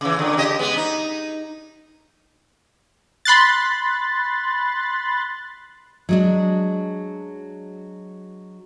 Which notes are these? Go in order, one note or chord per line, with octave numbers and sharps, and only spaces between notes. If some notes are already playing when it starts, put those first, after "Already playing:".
C#3 E3
A#2 D3
C#3 G4 D#5
G#3 B3
D#4
B5 C6 F#6 A6
F#3 G#3 D4